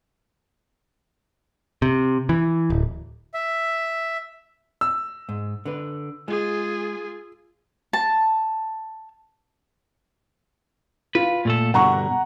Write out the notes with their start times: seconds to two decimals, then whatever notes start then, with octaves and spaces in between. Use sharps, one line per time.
1.82 C3
2.29 E3
2.70 D1
3.34 E5
4.81 E6
5.29 G#2
5.65 D3 B4
6.28 G#3 F4 G#4
7.93 A5
11.15 F4 B4
11.45 A#2 A3 A4
11.74 G2 B2 D3 F#5 A#5 C#6